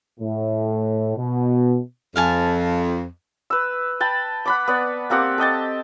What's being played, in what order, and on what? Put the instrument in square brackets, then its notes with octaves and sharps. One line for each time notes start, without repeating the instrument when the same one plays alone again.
[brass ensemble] A2
B2
[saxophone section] F2 [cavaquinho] F5 G#5 A5
[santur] B4 E6
G5 A5 B5
F#5 B5 D6
B3 D5
A#3 C4 G4 F#5
A4 D#5 G5 A5